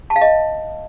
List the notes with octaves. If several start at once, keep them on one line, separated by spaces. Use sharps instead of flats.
A5
F5
D#5